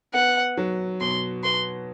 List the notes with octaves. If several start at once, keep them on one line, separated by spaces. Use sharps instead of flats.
B3 F#5
F#3
B2 C6
B3 C6